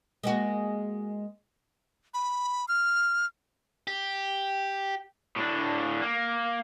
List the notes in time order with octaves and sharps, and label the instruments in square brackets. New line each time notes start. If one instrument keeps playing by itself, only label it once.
[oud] G#3 A#3 F#4
[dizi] B5
F6
[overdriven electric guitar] G4
A2 D4
A#3